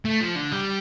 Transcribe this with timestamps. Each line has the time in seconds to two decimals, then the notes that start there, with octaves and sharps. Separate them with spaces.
0.05 A3
0.21 F3
0.35 D3
0.51 G3